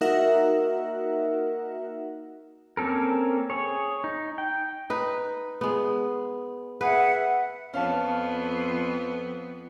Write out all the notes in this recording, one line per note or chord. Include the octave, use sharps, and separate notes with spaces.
A#3 D#4 F#4 A#4 E5 F#5
A#3 C4 C#4 A4 A#4
G#4 C#5
D#4
G5
D#4 B4
G#3 B3
G#4 B4 E5 F#5
F2 B3 C#4 F5 A5